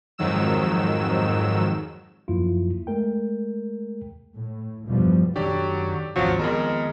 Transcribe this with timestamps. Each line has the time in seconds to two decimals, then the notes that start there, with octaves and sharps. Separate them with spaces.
0.18 F2 G#2 D#3 F#3 E6 E7
2.28 F#2 F3 F#3 A#3 E4 F4
2.87 G#3 A3 A#4 G5
4.36 A2
4.87 E2 G2 B2 F3 G3
5.36 F#2 D#3 F#3 D4 G4 A4 D5
6.16 G#1 D2 B2 F3 F#3 C4 F4
6.39 F2 D#3 G#3 B3 A#4 A#5